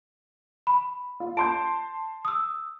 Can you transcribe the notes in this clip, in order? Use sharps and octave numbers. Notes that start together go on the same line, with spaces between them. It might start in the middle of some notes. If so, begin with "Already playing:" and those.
B5
F4
A5 C6 G6 D7
D#6 E6